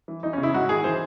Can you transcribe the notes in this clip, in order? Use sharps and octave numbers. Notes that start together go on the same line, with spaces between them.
E3
E3 D#4
C#4
C#3
E4
G#2 F#4
D#3 G#4
E3 C5